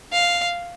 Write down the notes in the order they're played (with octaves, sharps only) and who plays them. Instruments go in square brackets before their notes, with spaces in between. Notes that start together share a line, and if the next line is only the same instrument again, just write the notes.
[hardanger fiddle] F5